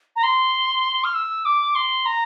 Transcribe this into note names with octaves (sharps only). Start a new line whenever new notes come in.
A#5
C6
F6
E6
D6
C6
A#5